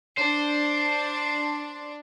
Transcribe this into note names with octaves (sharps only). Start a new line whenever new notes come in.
D4 C5